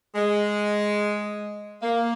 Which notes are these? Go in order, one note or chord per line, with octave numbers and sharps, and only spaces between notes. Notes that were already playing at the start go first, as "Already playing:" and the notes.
G#3
A#3